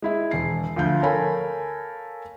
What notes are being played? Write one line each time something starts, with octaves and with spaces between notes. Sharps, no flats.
G#3 E4 E5
E1 C7
D2 F3 F5 G6
A4 A#4 C#5 F5 G#5 B5